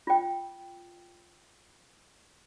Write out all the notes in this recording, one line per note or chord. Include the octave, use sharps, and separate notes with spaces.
F4 G5